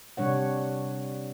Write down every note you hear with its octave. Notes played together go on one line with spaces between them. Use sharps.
C3 G3 D4 C#5 F#5